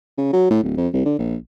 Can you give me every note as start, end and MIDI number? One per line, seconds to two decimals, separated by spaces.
0.17 0.28 49
0.33 0.46 54
0.50 0.62 45
0.63 0.72 26
0.77 0.88 41
0.93 1.03 36
1.05 1.15 50
1.19 1.35 34